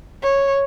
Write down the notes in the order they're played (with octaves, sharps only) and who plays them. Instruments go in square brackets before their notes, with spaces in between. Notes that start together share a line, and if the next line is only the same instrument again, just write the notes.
[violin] C#5